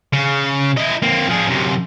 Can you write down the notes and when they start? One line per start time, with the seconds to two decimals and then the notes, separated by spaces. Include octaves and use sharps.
0.13 C#3
0.77 E4 D#5
1.02 A#3 C4
1.29 F3 G#4
1.47 F#2 C3